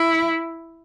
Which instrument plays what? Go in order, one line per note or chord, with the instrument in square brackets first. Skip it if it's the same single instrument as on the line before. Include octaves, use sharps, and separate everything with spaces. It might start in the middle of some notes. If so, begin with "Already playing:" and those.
Already playing: [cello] E4